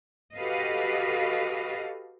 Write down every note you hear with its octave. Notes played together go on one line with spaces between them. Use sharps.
F#4 G4 A4 B4 D#5 F5